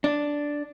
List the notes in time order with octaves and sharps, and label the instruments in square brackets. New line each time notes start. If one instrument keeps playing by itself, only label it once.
[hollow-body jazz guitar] D4